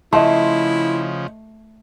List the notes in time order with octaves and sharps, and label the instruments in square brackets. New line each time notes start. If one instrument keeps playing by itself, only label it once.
[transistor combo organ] C#3 F3 [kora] A3 [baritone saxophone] E4 [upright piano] D#5 C6